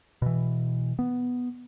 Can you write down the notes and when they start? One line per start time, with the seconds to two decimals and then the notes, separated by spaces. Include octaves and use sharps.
0.22 B2 E3
0.99 B3